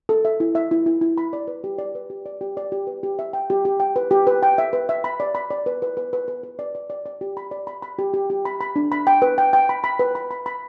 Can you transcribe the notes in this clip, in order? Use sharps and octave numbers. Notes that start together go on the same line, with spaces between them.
A4
E5
E4
E5
E4
E4
E4
B5
D5
B4
G4
D5
B4
G4
D5
G4
D5
G4
B4
G4
E5
G5
G4
G4
G5
B4
G4
B4
G5
E5
B4
E5
B5
D5
B5
D5
B4
B4
B4
B4
B4
B4
D5
D5
D5
D5
G4
B5
D5
B5
B5
G4
G4
G4
B5
B5
D4
B5
G5
B4
G5
G5
B5
B5
B4
B5
B5
B5